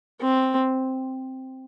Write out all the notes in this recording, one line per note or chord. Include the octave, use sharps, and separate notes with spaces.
C4